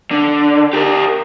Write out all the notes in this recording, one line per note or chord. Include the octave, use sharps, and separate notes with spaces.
D3
G4 A#4